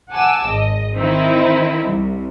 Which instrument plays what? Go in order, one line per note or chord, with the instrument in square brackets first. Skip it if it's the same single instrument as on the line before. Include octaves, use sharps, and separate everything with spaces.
[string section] F#5 G#5 A5 D6 E6
G#1 D#5
D#3 C4 D#4 E4
C2